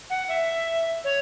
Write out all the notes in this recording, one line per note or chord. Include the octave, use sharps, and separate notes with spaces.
F#5
E5
C#5